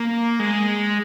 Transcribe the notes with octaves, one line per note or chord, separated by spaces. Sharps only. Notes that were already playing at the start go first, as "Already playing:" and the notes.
Already playing: A#3
G#3